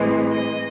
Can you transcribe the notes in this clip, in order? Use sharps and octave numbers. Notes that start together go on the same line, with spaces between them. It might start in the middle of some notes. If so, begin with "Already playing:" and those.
Already playing: A2 E3 G#3 C4
D#5